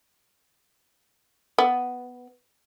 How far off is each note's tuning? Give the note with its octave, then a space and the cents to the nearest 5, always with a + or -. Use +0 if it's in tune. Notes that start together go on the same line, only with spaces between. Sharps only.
B3 +5